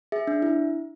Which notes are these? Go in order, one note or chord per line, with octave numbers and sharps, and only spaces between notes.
G#4 E5
D4
E4